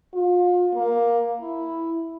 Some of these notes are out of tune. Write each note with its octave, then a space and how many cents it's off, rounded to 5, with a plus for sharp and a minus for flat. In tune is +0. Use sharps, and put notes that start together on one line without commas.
F4 +35
A#3 +10
E4 +0